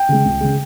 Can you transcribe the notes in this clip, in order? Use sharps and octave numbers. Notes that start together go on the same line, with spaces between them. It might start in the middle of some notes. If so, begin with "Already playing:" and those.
Already playing: G5
C#3 G#3
C#2
C#3 G#3